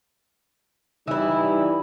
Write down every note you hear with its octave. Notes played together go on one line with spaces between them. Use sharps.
G2 E3 G3 D#4 E4